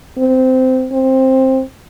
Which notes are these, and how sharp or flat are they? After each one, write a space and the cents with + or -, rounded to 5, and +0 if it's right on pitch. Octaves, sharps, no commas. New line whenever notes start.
C4 -15
C4 +10